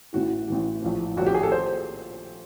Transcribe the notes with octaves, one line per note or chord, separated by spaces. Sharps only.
A1 A2 E3 F#4
A1 A2 E3
A#1 A2 F3
A#1 A2 F3 F#4
G4
G#4
A4
C5